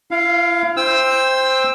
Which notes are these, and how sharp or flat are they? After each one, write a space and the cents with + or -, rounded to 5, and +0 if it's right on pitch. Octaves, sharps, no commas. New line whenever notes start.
E4 +45 F5 +0
C5 +0 G5 +20 E6 -5